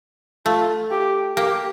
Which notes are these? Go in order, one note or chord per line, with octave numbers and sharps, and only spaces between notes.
A3 F4
G4
A#3 G4